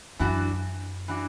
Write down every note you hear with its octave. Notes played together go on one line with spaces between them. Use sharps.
F#2 E3 D4 F#4
E3 D4 F#4